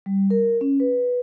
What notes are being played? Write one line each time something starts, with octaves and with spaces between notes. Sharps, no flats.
G3
A#4
C#4
B4